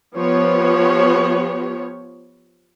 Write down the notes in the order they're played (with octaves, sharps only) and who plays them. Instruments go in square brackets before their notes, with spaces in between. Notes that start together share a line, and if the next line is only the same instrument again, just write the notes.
[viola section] F3 B3 G4 C#5